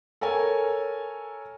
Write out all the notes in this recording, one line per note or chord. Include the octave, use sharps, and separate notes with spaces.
A4 A#4 C#5 G#5